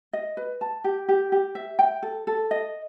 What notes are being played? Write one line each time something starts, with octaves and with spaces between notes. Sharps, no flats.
D#5
B4
A5
G4
G4
G4
E5
G5
A4
A4
D#5